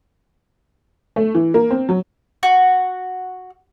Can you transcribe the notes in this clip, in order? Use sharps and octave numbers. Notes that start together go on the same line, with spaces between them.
A3
E3
A#3
C4
F#3
F#4